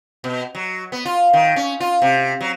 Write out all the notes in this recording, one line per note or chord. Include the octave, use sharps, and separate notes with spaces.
B2
F#3
B3
F4
D#3
C#4
F4
C3
F#3